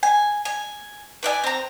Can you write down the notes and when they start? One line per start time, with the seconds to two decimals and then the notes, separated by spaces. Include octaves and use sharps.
0.03 G#5
0.45 G#5
1.23 B4 D5 E5 G#5
1.44 C4 A#5